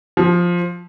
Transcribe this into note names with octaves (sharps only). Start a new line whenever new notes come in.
F3